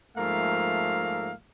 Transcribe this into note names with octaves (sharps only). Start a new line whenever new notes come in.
G#2 F3 A3 A#3 E5 F5